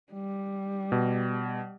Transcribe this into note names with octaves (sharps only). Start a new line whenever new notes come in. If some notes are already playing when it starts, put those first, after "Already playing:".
G3
B2